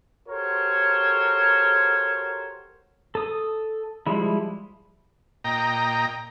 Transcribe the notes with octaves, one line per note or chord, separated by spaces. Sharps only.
F#4 G4 A4 A#4 C5 C#5
A4 D#6
F3 G3 G#3 E4
A#2 D#5 G5 A#5